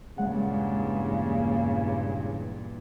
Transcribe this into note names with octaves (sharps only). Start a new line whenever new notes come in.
E2 G2 A#2 C#3 G#3 F#5